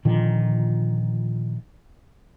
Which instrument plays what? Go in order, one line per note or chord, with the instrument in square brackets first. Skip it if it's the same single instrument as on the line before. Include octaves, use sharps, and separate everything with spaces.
[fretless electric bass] A#2 D3 D#3 F3